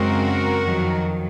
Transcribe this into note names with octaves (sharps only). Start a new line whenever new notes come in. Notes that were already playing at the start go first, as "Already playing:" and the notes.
Already playing: F#2 C#3 G#3 C4 F#4 A#4
F2 D#3 F#3